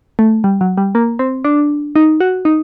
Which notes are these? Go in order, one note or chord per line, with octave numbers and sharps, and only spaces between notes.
A3
G3
F#3
G3
A#3
C4
D4
D#4
F#4
D#4